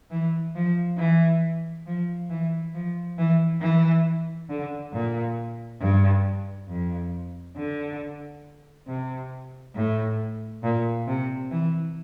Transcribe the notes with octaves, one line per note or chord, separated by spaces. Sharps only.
E3
F3
E3
F3
E3
F3
E3
E3
D3
A#2
G2
F2
D3
C3
A2
A#2
C3
E3